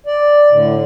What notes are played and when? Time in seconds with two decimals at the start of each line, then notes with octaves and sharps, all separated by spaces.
0.06 D5
0.51 A2 D3